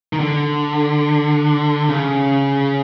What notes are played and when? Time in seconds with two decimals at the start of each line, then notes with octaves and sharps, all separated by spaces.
0.13 D#3
0.20 D3
1.89 C#3